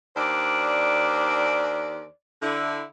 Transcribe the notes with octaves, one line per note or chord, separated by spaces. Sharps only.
D#2 D4 C5 D5
D3 E4